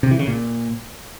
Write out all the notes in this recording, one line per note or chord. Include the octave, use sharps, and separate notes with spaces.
C3
E3
C#3
A#2